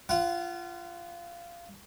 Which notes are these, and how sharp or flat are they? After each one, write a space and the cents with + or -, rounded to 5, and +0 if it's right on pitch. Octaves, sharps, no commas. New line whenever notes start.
F4 -20 F#5 +15